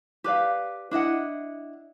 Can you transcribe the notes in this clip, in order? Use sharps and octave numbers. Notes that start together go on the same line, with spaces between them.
G4 B4 D5 F5
D4 E4 D#5 F#5